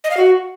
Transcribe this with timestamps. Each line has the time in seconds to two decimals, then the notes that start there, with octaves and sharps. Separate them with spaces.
0.04 D#5
0.11 F5
0.17 F#4